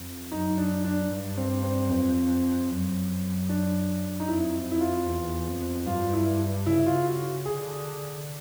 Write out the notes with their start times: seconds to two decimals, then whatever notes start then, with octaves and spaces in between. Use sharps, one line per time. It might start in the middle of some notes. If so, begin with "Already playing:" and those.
Already playing: F2
0.32 F#2 D#4
0.57 D4
0.84 D4
1.10 G2
1.37 C4
1.63 C4
1.89 F2 C4
2.70 F#2
3.49 D4
4.20 D#4
4.28 F2 E4
4.71 E4
4.81 F4
5.07 E2
5.47 F2
5.86 G2 F4
6.13 E4
6.66 C#3 E4
6.86 F4
7.06 F#4
7.46 D3 G#4